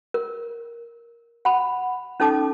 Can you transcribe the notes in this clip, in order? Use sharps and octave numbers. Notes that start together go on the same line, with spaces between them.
A#4
F#5 B5
C#4 D#4 A4 A5 D6